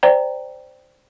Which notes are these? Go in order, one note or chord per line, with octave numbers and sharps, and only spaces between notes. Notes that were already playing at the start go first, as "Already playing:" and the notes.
C5 D5 G5 A#5